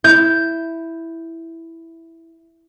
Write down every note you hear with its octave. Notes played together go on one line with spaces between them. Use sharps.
E4 G6